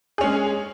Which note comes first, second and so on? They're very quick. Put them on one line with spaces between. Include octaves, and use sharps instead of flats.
G#4 C#4 G#3